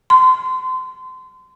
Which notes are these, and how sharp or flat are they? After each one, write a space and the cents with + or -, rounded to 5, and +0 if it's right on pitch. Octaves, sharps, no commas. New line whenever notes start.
C6 -25